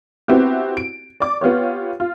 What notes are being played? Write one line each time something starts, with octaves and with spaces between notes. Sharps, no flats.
B3 C4 E4 F#4 G4
D7
D5 D6
B3 F4 G4 C#5
F4